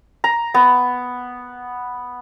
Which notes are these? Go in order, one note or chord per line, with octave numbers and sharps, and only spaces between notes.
A#5
B3